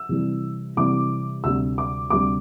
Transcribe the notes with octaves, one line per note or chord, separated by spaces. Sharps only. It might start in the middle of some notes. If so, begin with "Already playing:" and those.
Already playing: E6
C3 E3 G3
C3 E3 G3 D6
D2 C3 G3 E6
D6
D2 C3 G3 D6